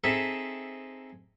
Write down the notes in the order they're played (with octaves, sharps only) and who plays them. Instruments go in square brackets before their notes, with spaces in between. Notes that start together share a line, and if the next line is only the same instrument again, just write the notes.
[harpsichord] C4 D#4 G#4 A4 E5